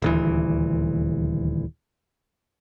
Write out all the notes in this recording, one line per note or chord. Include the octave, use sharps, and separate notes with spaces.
D#1 D2 E3